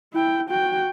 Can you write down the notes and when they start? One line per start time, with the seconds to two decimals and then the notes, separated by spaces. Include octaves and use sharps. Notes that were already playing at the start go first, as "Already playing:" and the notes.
0.13 E4 G5
0.49 F#4 G5